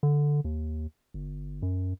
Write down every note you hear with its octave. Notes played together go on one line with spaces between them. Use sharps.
D3
D#2
G1
F#2